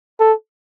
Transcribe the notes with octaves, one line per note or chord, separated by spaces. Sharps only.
A4